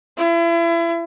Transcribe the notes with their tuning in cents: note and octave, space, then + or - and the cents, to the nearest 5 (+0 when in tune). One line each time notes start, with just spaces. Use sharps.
E4 +35